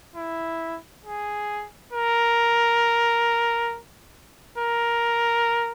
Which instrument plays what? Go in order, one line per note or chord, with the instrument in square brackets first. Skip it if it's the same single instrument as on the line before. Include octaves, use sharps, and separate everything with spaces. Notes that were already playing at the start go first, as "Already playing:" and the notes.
[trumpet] E4
G#4
A#4
A#4